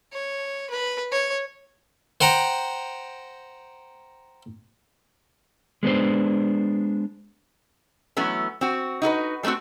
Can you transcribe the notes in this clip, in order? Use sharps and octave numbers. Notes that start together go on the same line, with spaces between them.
C#5
B4
C#5
C5 F#5 G5 A#5
G#3 B3 D4 C5
E3 F#3 A3 B3 C#4
C4 F#4
D#4 F#4 A4 B4
G3 A3 B3 C4 F#4